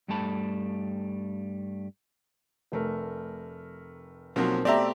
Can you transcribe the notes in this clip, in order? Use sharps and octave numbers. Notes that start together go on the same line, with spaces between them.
G2 G3 A3 A4 A5 B5
F1 A3 A#4
B1 F3 F#3 A#3 C4
B2 A3 C4 G4 D5 E5 A#5